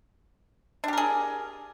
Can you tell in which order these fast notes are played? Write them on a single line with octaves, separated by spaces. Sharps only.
D4 G4 A#4 G#4